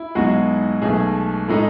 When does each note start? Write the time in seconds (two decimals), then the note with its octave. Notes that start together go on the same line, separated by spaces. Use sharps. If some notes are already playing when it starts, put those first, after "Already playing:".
Already playing: E4
0.15 B1 B2 G#3 D#4 F#4 G#4
0.82 B1 B2 A3 G#4
1.48 A2 G#3 D#4 A4